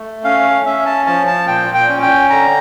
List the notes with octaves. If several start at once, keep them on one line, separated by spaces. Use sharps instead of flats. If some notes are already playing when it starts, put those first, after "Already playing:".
Already playing: A3
C#4 F5
C#4 E5
A5
F3 A5
A5
A#2 G5
G5
C#4
G5
D3 A#5